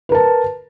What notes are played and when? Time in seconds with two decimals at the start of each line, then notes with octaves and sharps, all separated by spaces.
0.09 B4
0.12 A#4
0.15 A5